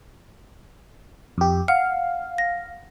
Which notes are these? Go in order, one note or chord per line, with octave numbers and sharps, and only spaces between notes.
F2 G4
F5 F#5
A#6